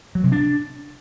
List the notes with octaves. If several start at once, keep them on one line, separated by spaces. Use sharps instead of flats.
F#3
C3
D4